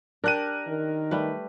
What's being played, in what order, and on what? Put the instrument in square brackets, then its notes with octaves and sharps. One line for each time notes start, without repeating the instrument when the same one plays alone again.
[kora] D4 G4 [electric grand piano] A#4 F#6 D#7
[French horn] D#3
[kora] G3 A3 B4